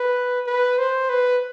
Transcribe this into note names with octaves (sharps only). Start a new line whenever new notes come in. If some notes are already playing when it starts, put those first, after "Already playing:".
Already playing: B4
B4
C5
B4